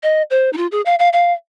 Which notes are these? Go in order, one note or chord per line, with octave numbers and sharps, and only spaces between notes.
D#5
C5
D#4
F4
G#4
F5
F5
F5